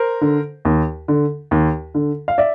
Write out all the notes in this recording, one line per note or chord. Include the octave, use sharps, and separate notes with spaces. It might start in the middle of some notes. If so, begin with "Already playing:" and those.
Already playing: A#4 C5
D3
D#2
D3
D#2
D3
F5
D5 E5